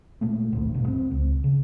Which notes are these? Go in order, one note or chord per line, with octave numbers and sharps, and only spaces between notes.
A#2 G#3 A3
D#1 A1 D2
E1 G2 B2
C4
C#2
C#3